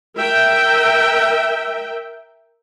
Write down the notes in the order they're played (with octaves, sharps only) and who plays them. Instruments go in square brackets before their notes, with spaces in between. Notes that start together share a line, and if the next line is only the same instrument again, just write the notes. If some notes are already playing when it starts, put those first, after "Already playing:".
[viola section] A#4 E5 G5